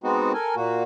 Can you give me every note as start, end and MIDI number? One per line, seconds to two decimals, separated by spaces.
0.04 0.32 56
0.04 0.32 59
0.04 0.32 60
0.04 0.32 63
0.04 0.32 66
0.34 0.55 69
0.34 0.55 70
0.34 0.55 80
0.56 0.83 46
0.56 0.83 58
0.56 0.83 66